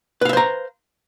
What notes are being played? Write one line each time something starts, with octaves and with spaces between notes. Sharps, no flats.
B4 C5 E5 F5 A#5